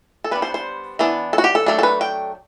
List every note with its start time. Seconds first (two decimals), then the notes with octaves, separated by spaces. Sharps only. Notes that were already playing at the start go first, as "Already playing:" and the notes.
0.24 A4
0.31 G3 B3 D4 B4
0.42 C5
0.54 C5
0.99 E3 B3 D4
1.33 A4
1.38 F#4
1.44 G4
1.55 A4
1.66 F#3 A3 D4
1.79 A4
1.83 B4
2.01 G5